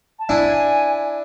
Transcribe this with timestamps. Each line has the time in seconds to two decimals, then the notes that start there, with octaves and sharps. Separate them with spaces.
0.19 A5
0.29 D4 E4 G#5